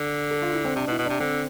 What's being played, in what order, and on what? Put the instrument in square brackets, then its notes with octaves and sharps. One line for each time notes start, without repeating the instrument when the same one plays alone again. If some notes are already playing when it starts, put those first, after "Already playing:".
Already playing: [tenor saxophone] D3
[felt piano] A4
F4
E4
C4
[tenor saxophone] C3 [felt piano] D4
[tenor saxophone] B2
[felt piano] E4
[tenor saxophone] B2
[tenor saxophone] C3 [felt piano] D4
[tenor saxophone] D3 [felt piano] C4